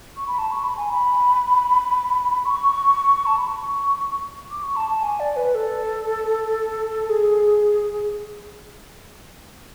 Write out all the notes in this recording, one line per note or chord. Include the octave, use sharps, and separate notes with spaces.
C#6
B5
A5
C#6
B5
G#5
B5
C#6
A5
B5
C#6
D6
C#6
A5
A5
G#5
D5
B4
A4
G#4